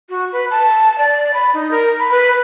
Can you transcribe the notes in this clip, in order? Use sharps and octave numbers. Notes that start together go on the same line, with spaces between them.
F#4
B4
A5
D5
B5
D#4
A#4
B5
B4